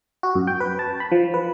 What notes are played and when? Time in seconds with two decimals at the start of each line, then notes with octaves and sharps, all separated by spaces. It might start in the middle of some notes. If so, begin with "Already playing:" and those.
0.23 F#4
0.35 F#2
0.47 G5
0.60 B4
0.79 A5
1.00 B5
1.12 F3
1.34 B4